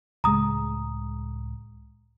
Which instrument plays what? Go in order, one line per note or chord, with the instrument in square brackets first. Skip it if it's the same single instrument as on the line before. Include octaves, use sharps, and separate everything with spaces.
[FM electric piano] C#2 A2 G#3 [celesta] A#5 D#6